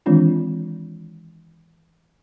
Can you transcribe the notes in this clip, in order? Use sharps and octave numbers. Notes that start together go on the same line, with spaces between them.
D#3 E3 G#3 C4 D4 F4